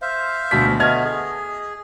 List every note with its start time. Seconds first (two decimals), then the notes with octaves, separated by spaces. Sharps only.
0.02 C5 E5 F5
0.51 D2 B2 B6
0.80 A3 B3 D#5 F6 G#6
1.05 G#4